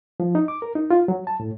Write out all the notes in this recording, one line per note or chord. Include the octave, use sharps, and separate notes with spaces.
F3
D#4
D6
A#4
D#4
F4
F#3
A5
A2